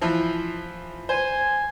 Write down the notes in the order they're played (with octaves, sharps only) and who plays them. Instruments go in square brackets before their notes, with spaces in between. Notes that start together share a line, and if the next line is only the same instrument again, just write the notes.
[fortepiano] E3 F3
[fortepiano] C5 [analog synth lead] G#5